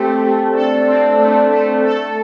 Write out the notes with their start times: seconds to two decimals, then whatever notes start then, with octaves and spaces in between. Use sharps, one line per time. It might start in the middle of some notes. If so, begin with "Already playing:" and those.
Already playing: A3 C4 G4 A4
0.22 A3
0.55 D4 A4
0.87 C4
1.19 A3
1.52 A3
1.84 A4